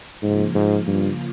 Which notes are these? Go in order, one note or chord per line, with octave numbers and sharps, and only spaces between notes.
G#2 C#3 F3 A#3 F4
G#2
G2